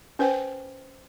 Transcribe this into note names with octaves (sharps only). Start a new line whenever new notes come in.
C#4 B4 C5 G5